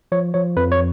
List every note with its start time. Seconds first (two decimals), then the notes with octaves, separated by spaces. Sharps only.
0.12 F3 C#5
0.34 F3 C#5
0.57 F2 B4
0.72 C#5